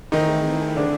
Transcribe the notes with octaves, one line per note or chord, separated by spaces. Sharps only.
D#3 E3 A3 C4 D#4 E4 G#4
D3 D4